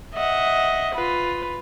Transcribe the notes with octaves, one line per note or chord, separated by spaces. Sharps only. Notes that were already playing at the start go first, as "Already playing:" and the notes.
D#5 E5 F#5
F4 B4